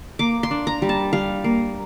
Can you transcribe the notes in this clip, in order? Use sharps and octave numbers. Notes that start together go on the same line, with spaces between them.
A#3 D6
C6
D4
A#5
G3
A5
G3 F5
A#3